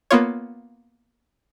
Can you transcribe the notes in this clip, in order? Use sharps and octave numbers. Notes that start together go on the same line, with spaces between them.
A#3 B3 F4 C#5